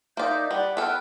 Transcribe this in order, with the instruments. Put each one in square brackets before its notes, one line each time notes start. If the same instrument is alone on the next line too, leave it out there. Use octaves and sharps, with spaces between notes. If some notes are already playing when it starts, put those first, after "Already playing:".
[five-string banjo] A#3 D5 [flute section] D#4 E5 G6
[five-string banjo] G3 [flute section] B4 D5 F#5
[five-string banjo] B3 A4 [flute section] G5 F6 F#6